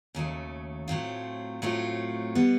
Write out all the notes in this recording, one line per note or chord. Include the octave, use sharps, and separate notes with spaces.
D#2 C#3 F#3 A3
A2 F#3 A3 C4 F4
A2 F#3 A3 C4 F4
B2 G3 B3